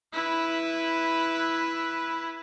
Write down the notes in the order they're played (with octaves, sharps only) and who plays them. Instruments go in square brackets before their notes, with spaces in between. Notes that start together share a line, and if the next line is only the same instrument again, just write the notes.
[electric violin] E4 B4